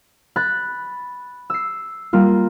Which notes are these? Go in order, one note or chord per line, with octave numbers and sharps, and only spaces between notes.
B5 F#6 A6
E6 C7
G3 A#3 F4